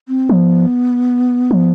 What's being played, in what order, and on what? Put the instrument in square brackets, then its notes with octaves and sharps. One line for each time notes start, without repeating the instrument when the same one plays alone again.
[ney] C4
[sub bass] F3 [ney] B3
[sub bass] F3